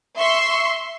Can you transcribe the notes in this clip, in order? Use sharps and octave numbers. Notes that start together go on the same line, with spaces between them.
E5 C6 C#6